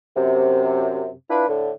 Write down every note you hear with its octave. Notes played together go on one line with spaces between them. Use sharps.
F#2 C3
D4 E4 F4 B4
A2 D3